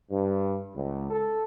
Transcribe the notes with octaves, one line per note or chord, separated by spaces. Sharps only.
G2
C#2
A4